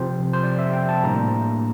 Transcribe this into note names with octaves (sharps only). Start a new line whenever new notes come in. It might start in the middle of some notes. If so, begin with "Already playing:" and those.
Already playing: C3 F3 C4 C5
C5
D5
E5
G5
A5
A2 G3 A#3 D4 A#5